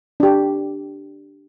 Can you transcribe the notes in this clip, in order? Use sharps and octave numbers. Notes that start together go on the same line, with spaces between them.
D4 G4